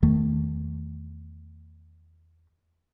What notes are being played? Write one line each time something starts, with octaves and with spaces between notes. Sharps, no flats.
E2 D#3 A3